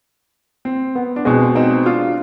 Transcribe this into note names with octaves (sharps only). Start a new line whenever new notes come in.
C4
B3
D4
B2 G#3 C4
C4 D#4
D4 F4